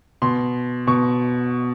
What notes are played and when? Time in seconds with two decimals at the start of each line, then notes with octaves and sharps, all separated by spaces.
0.22 B2 C6
0.87 B2 C#6